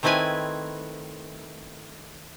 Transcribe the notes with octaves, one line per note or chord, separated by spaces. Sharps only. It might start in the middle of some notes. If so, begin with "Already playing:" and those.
D#3 A3 C4 E4 B4 G#5